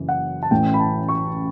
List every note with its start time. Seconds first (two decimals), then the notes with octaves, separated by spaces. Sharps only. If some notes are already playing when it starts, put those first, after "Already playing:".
Already playing: F#1 F#2 C#3 E3
0.09 F#5
0.43 A5
0.51 A1 A2 E3 A3 C#4 G5
0.74 B5
0.80 A5
1.09 C#6